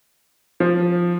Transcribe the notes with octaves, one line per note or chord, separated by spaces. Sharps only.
F3